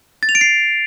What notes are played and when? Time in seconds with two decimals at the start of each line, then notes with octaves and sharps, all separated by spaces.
0.23 A6
0.29 F7
0.35 D7
0.41 C7